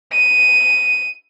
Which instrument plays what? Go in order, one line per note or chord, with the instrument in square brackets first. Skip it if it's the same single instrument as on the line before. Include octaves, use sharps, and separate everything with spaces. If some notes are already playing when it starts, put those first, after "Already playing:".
[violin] D#7